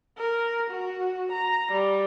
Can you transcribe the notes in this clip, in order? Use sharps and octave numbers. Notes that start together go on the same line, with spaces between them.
A#4
F#4
A#5
G3